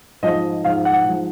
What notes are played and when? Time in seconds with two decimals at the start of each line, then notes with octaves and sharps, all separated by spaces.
0.23 G#2 F3 D#5
0.64 G#2 F3 F5
0.85 F#5
1.05 G#2 F3